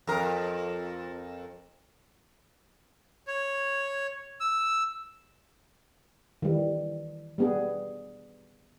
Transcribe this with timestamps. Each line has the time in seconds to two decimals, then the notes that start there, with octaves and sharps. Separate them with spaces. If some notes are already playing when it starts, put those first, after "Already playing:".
0.07 F2 A#4
3.27 C#5
4.40 E6
6.42 D#3 E3 G3
7.38 G3 B3 G#4